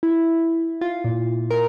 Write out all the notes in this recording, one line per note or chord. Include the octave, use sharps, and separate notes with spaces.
E4
F4
A#2
A#4